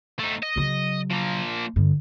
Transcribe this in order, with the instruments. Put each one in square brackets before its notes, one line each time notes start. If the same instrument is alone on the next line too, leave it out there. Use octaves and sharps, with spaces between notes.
[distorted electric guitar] A3 D#4
D#5
[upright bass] C#3 F#3
[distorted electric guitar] F3 A#3
[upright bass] G2 D3